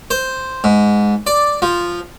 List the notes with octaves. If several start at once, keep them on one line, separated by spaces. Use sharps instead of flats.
C5
G#2
D5
F3